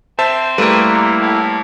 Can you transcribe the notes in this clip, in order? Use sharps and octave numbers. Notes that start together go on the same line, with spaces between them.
C4 C5 E5 A5
G3 A3 A#3 E4 A#4 B4
C3
A2